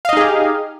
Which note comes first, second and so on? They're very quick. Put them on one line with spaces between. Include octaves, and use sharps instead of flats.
F5 D#5 D#4 G#4 G4